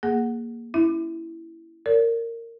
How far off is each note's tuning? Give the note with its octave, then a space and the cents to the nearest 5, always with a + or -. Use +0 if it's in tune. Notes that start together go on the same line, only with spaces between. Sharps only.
A#3 +0 G#4 +0 F#5 +0
C#4 +0 E4 +0 E5 -10
A#4 -15 D5 -45